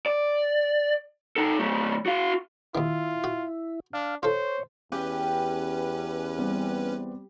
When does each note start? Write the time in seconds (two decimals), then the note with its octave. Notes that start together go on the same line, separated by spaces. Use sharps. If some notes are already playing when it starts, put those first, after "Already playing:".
0.06 D5
1.36 D#4 A4
1.59 F#3 A3
2.06 F#4 F5
2.75 D#2 D#3 E4 F4
3.24 F#4
3.93 D4 F5
4.23 F4 A4 C5 C#5
4.92 E2 C#4 G4 B4 G5
6.38 G3 B3 C4